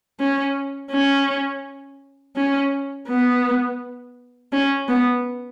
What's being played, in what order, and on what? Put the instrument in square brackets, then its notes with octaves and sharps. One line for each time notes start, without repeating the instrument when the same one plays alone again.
[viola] C#4
C#4
C#4
B3
C#4
B3